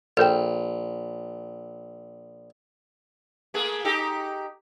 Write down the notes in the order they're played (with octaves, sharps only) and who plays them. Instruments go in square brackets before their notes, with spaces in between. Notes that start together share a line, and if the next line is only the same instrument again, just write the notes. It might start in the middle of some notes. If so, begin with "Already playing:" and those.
[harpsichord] A#1 [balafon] A4 A#4 G5
[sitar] A3 A#3 G#4
D#4 G4 A4